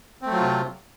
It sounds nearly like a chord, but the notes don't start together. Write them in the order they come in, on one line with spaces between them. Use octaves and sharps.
C4 A3 F#3 F4 C3